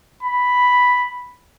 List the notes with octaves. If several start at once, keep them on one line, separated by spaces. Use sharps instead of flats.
B5